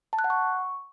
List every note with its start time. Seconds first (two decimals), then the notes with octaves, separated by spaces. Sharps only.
0.13 A5
0.19 F#6
0.24 F#5
0.30 C#6